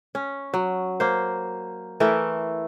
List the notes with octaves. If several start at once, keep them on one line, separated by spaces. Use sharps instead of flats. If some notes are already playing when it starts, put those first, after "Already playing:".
C#4
F#3
A#3 C5
E3 A3 E4 A#4